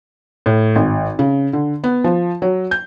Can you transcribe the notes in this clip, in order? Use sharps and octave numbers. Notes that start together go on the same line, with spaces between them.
A2
G#1
C#3
D3
B3
F3
F#3
G6